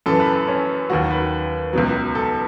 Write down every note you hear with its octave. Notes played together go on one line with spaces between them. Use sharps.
F#2 E3 A4
B4
A4
C#4
D#2 D#3 F#3 F#4
B4
C#2 B2 F#3
A4